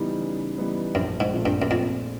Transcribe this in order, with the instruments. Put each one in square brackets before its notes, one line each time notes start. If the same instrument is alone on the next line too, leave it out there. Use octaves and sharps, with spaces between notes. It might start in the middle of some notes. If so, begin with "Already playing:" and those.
Already playing: [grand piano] C#3 E3 G3 B3 D#4
C#3
E3 G3 B3 D#4
[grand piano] A#1 [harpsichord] F#2
[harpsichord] G#2
[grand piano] A#2 F3 A3 C4
[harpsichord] G2
F#2
[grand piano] A#1 [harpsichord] F2